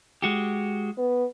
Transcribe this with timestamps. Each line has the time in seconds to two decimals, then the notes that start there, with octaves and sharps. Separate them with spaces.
0.22 G#3 F#4 G4
0.98 B3